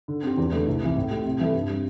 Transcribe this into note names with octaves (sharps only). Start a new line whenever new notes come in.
D3
C4 G4
E2
D3 A3
C2
C3 E3
A2
A3 C4 G4
C3
E3 G3 E4 A4
G2
G3 C4